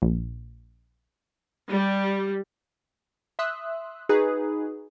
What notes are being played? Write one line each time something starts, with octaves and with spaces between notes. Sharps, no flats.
A#1
G3
E5 C6 D#6 E6 F#6
D#4 F#4 G#4 B4